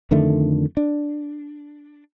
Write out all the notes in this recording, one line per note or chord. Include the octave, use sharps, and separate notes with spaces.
F2 D3 D#3 A3
D4